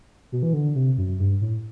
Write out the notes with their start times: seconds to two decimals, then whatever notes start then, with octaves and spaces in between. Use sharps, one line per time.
0.32 B2
0.43 E3
0.53 D3
0.75 C3
0.98 F#2
1.20 G2
1.41 A2